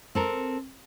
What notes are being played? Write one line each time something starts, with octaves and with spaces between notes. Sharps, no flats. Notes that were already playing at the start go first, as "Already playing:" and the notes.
C4 A4 A#4